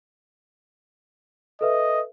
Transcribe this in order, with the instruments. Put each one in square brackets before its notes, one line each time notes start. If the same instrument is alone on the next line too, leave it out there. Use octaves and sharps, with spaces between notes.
[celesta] A4 B4 E5 [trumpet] D#5